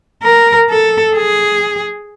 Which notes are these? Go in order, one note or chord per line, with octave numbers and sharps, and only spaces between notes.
A#4
A4
G#4